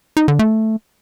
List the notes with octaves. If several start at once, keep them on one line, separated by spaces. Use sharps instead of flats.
D#4
D3
A3